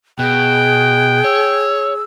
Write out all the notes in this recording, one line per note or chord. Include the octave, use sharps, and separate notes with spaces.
B2 G#4 G5 F#6
C#5 E6